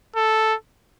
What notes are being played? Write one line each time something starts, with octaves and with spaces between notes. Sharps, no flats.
A4